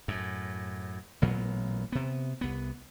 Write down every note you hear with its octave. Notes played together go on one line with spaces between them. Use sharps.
F#2 A2
A1 A#2 F#3 B3
C3 B3
C2 B3